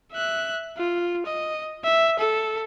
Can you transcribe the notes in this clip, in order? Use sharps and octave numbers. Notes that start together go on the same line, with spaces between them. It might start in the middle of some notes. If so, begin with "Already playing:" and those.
E5 F#6
F4
D#5
E5
A4